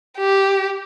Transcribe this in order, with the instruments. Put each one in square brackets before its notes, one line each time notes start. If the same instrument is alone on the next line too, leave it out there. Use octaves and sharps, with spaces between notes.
[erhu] G4